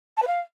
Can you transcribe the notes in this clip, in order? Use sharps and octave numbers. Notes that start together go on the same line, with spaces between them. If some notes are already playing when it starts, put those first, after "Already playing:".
A5
B4
F5